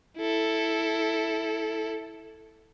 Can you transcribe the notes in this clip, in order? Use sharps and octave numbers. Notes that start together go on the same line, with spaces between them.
E4 A4